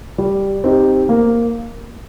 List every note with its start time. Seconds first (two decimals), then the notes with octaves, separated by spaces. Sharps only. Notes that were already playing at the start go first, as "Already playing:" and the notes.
0.18 G3
0.64 C4 D#4 G4
1.09 A#3